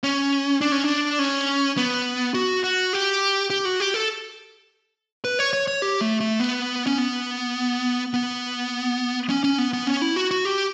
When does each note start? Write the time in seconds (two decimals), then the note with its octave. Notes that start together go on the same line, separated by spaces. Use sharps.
0.04 C#4
0.61 D4
0.72 C#4
0.84 D4
1.19 C#4
1.77 B3
2.34 F#4
2.64 F#4
2.93 G4
3.50 G4
3.65 F#4
3.80 G4
3.94 A4
5.24 B4
5.39 C#5
5.53 C#5
5.68 C#5
5.82 G4
6.01 A3
6.20 A3
6.40 B3
6.87 C#4
6.98 B3
8.14 B3
9.30 C#4
9.44 C#4
9.58 B3
9.73 B3
9.87 C#4
10.01 E4
10.16 F#4
10.31 F#4
10.45 G4